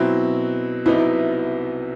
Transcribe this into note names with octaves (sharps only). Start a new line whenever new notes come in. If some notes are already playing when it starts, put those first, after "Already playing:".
Already playing: B2 F#3 C4 E4
C2 C3 F#3 B3 D#4 E4